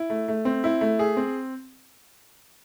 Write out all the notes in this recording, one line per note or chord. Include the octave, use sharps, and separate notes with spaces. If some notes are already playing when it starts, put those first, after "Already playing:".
Already playing: E4
A3
A3
C4
E4
A3
G#4
C4